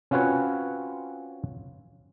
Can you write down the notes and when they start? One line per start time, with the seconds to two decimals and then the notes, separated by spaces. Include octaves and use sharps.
0.11 C4 C#4 F4 F#4 B4 C#5